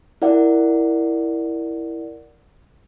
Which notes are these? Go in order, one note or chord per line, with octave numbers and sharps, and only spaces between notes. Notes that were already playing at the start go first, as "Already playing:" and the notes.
E4 A#4 D5 F#5